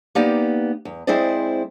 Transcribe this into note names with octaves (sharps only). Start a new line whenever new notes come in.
A#3 B3 D#4 G4 D5
E2
G#3 C4 E4 G#4 C5 D5